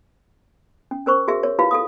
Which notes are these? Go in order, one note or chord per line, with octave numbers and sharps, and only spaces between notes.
C#4
C#4 A#4 C5 C#6
F#4 G#4 A#4 E5
A#4 C#5
E4 F4 G4 B4 F5
A4 F5 D#6